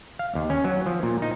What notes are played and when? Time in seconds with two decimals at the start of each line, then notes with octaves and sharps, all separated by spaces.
0.19 F5
0.35 D#2
0.50 C#4
0.64 F#3
0.86 F3
1.03 A#2
1.22 D#4